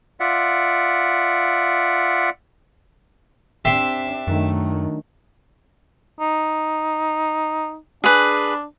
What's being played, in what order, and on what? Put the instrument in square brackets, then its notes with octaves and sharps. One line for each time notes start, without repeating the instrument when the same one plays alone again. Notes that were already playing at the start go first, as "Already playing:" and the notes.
[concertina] F4 D5 E5 F#5
[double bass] C4 D4 [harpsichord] G4 E5 C6
[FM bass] F#2 [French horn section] D#3 D4 [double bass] F#3 A3
[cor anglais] D#4
[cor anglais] D4 [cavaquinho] G#4 B4